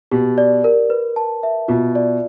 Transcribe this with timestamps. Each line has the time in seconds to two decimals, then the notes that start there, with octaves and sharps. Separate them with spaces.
0.11 B2 G4
0.38 D5
0.64 A#4
0.90 B4
1.16 A5
1.43 E5
1.68 B2 F4
1.95 D5